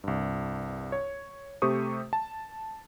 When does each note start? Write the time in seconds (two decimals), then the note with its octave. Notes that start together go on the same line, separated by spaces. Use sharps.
0.04 C2 G2
0.92 C#5
1.62 C3 A3 G4 C5 C#6 D#6
2.13 A5